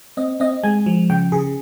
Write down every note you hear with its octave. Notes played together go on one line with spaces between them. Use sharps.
C4 D#5
C4 D#5
G#3 G#5
F3
C#3 G5
C#3 G#4